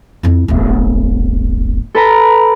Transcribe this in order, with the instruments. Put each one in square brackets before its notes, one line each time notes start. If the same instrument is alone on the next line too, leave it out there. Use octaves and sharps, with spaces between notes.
[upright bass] F2 E4
D1 G1
[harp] A4 B4 A#5